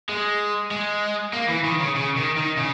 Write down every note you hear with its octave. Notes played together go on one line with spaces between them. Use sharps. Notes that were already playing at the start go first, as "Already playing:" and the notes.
G#3
G#3
A#3
E3
D#3
C#3
C#3
D#3
D#3
C#3